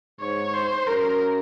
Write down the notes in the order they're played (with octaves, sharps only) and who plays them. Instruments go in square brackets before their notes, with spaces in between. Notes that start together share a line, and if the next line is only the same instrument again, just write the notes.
[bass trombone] G#2 [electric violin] C#5
[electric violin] C5
[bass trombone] F#2 [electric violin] A#4